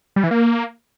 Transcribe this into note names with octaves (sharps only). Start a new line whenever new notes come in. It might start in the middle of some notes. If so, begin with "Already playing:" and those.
G3
E3
A#3